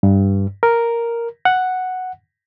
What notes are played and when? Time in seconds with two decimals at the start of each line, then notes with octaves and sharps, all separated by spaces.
0.03 G2
0.63 A#4
1.45 F#5